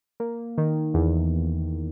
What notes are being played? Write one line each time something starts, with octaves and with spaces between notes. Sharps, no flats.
A#3
D#3
E2